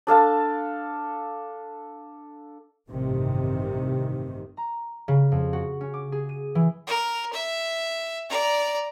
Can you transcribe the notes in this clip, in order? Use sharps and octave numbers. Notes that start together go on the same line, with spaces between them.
D4 A4 F5 A5
A1 G2 C3 D#3
A#5
C#3
F2
F#4
C#4
D6
G#4
D#7
E3
A#4
E5
D5 A#5